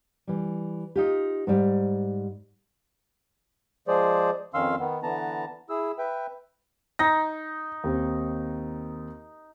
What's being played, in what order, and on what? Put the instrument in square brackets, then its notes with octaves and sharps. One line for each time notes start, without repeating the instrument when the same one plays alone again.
[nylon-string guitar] E3 G3
D#4 F4 G4
G#2 G3
[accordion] F3 G#3 G#4 C5 D5
F2 D#3 C#4 F5 C6 E6
D#3 B3
D3 E3 B3 A5 A#5
E4 G#4 E6
B4 E5 G5
[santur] D#4 [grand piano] A#6
[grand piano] D#2 C4